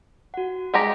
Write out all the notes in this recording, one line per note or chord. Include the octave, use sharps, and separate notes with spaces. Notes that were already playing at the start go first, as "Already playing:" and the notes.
F#4 F#5
G#3 G4 G#4 D#5 A#5